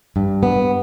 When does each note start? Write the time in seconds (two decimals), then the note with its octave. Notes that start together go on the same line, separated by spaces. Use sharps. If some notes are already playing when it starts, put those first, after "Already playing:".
0.16 G2
0.43 B3